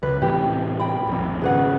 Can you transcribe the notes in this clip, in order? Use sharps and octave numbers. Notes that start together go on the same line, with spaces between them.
C#2 B4
A2 C3 E3 G4
G5 B5
D#1 A#1 F2
G#1 C#3 G#4 B4 F#5